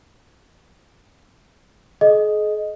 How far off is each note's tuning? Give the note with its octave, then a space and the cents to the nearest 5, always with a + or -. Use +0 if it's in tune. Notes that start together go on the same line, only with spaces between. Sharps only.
G#4 +40 D#5 +0